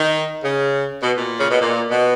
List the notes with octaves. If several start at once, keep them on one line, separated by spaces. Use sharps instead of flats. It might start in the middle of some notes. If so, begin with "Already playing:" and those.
Already playing: D#3
C#3
B2
A#2
C#3
B2
A#2
B2